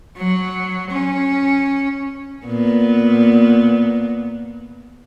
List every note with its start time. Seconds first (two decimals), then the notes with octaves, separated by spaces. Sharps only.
0.17 F#3
0.91 C#4
2.45 A#2 B3